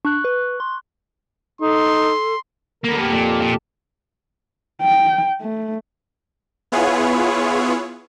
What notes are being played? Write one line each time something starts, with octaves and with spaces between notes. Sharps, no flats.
D4 C#6 F#6
B4
C6
D#4 A4 C6
D3 A#3 B3 A#4
F2 G4 A5
A#2
A#2
G5
A3
B3 E4 F4 G#4 B4 C#5